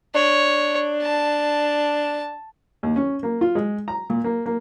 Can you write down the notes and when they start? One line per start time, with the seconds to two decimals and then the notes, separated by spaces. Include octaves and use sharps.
0.15 D4 C#5
1.02 A5
2.83 D#2
2.96 C#4
3.23 A#3
3.41 F4
3.55 G#3
3.88 A#5
4.10 A#2
4.24 A#3
4.46 A#3